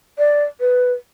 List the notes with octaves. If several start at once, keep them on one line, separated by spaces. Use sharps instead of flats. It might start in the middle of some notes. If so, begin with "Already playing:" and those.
D5
B4